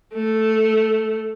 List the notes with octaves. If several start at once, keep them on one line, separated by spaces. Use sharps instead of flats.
A3